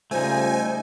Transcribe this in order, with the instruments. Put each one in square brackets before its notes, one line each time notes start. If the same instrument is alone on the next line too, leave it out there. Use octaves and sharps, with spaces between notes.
[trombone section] C#3 G3 F4 [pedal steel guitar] A3 D#4 [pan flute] C5 [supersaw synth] G#5